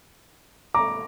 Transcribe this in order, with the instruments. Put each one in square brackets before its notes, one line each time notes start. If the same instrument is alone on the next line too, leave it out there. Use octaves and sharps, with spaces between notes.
[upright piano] A#5 D6